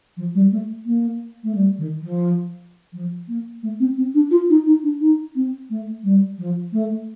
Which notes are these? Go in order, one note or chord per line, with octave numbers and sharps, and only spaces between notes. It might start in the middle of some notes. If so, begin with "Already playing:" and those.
F3
G3
A3
A#3
A3
G3
D#3
F3
F3
A#3
A3
C4
C4
D4
F4
D#4
D#4
D4
D#4
C4
A3
G3
F3
A3